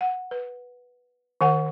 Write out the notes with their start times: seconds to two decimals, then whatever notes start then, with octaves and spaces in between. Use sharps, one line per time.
0.01 F#5
0.31 B4
1.41 D#3 A#4 F#5 G#5